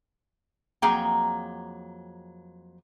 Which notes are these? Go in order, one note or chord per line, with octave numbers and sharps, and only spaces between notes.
F2 F#3 A#3 G#4 G5 A#5